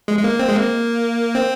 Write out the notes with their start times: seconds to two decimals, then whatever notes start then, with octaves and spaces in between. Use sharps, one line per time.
0.08 G#3
0.19 G#3
0.24 A#3
0.40 C4
0.49 G#3
0.55 A#3
1.35 C4